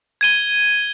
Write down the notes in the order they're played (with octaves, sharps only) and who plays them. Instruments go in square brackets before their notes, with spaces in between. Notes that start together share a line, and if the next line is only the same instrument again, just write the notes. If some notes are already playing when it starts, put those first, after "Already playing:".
[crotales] G#6 D#7 G7